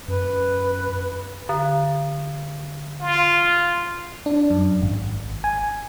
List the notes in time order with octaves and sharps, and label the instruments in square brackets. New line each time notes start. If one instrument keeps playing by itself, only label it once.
[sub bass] F#2 [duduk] B4
[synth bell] D3
[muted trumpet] F4
[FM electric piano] D4
F#2
G#1
G#5